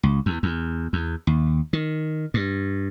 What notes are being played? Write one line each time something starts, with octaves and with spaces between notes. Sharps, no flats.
C#2
E2
E2
E2
D#2
D#3
G2